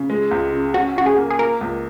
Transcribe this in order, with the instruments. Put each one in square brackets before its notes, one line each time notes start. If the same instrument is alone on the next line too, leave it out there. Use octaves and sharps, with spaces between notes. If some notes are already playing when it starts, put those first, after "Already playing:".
Already playing: [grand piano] C#3
G#3
C#2
C#3
[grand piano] C#4 [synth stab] F#4
[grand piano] C#3 [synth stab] F#4
[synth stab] G#4
[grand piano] A#3
[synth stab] G#4
[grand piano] A#3 [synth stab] A#4
[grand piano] C#2